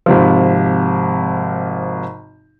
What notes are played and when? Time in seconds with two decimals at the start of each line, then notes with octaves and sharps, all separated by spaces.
0.06 G#1 C3 F3